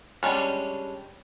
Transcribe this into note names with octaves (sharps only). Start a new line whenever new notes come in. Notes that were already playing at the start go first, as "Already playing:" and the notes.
G3 G#3 C#4 D4